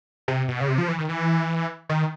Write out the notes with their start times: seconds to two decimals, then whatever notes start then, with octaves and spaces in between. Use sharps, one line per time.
0.28 C3
0.48 B2
0.61 C#3
0.68 C3
0.78 F3
0.88 E3
0.98 D#3
1.09 E3
1.89 D#3